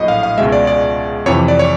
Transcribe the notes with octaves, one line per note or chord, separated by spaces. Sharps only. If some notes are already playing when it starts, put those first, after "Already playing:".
Already playing: A#1 A2 F#3 A#3 D#5
F5
F5
C#2 B2 G#3 E5
D5
D5
F2 C3 E3 C#5
D5
C#5